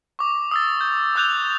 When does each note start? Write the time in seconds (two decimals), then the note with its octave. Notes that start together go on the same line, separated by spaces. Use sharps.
0.19 C#6 D6
0.51 D#6 E6 A6
0.81 G6
1.15 D6 E6 F#6 G6 F7